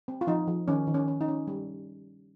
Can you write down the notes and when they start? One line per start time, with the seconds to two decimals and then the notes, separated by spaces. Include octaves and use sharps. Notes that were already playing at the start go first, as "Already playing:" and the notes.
0.08 C4
0.21 F4
0.27 F3 D#4
0.47 F3
0.68 D#3 C#4
0.87 D#3
0.94 C#4
1.08 C#4
1.21 D#4
1.28 C#4
1.47 G3